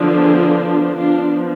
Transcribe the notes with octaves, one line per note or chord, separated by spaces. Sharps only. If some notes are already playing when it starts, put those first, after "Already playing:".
Already playing: D3 F3 B3 D4
G#4
F3 B3 D4 F4